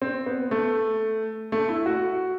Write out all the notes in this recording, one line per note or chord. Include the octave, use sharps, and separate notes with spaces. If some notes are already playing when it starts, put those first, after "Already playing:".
C4
B3
A3
A3
E4
F#4